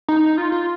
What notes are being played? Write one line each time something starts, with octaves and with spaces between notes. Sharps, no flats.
D#4
F4
F4